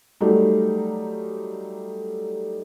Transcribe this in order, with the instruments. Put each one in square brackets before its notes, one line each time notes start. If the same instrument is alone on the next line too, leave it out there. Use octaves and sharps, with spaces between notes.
[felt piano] F#3 G3 A3 D#4